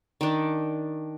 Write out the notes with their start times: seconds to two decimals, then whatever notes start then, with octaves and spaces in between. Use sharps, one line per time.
0.21 D#3 D4